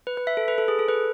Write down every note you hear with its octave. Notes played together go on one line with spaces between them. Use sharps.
B4
B4
E5
A4
B4
A4
G#4
A4
B4